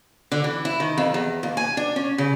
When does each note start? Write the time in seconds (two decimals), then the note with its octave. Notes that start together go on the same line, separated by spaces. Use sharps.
0.32 D3
0.44 E3
0.65 E4
0.80 D#3
0.98 F2
1.14 E2
1.43 D#2
1.57 G#5
1.77 D4
1.96 C#4
2.18 C#3